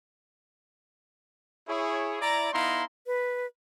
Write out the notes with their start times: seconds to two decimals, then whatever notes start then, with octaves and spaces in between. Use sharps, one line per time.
1.68 E4 G#4 C#5
2.20 E4 D5 A#5
2.52 B3 D#4 E4 F5 A#5 C6
3.07 B4